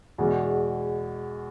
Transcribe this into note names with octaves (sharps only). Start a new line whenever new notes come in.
E2 B2 G#3